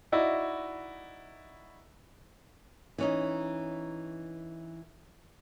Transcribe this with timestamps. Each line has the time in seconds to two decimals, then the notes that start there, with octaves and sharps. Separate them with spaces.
0.12 D#4 E4 F#4 D5 D#5
2.98 E3 C#4 D#4